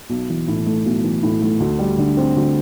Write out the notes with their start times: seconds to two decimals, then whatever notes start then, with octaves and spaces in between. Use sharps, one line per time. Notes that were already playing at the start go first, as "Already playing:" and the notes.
0.10 B1
0.29 E3
0.48 A2
0.66 A3
0.85 B1
1.04 E3
1.23 A2
1.42 A3
1.60 D2
1.79 G3
1.98 D3
2.17 C4
2.36 D2